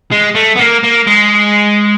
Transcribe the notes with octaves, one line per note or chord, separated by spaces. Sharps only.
G#3
A3
B3
A#3
A#3
G#3